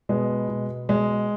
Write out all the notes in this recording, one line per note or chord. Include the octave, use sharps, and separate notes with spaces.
B2 G#3 B3
B2
B2 G#3